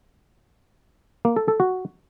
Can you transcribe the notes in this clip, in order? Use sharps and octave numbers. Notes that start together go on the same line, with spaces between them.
A#3
A4
A4
F#4